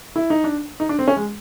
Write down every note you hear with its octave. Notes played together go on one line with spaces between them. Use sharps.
E4
D#4
D4
D#4
D4
C4
C#4
G#3